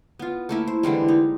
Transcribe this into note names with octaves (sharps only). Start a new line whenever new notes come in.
B3 F4
A3 A#3 E4
C5
D3 E3 G3 G#3
D#4